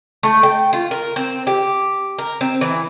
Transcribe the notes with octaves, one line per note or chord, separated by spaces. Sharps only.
A3
G5
F4
A#4
C4
G4
A#4
C4
E3